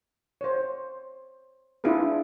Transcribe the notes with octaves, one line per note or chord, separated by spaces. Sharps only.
C5 C#5
D4 E4 F4 G#4 B4